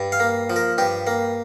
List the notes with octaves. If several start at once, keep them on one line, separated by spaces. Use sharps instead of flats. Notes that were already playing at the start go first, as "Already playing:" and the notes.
Already playing: G2
F5
A#3
F3
A#4
G2 G4
A#3